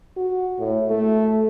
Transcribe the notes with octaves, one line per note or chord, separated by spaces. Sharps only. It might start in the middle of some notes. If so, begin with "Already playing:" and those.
F#4
A2
A3